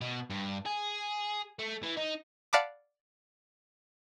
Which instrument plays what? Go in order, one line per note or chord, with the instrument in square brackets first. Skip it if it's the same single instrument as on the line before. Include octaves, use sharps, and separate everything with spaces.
[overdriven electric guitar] B2
G2
G#4
A3
E3
D#4
[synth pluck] D5 F5 F#5 A5 B5 D6